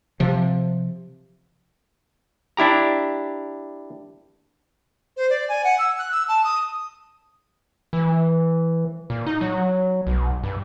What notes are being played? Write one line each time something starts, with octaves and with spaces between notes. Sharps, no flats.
C3 F3
D4 E4 G4 A#5
C5
D5
G#5
F#5
E6
F#6
E6
A5
D#6
E3
A#2
D#4
F#3
B1
G2